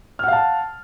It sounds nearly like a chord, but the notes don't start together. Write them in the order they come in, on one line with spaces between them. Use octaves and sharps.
F6 F#5 F5 A5